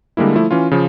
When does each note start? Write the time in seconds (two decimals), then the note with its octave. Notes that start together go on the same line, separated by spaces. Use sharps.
0.17 D3 G3 G#3 A#3 E4
0.35 F3 A3 E4
0.51 E3 C#4 F4
0.71 C#3 F3